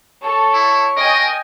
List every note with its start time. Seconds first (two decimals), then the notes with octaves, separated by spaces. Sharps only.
0.23 A4 C#5
0.54 E4
0.97 A#4 D#5 G5 G#5